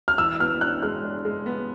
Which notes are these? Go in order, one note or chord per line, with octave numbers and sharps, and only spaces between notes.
F6
E3 E6
B3 F6
D4 F#6
G#3 F6
D4
G#3
B3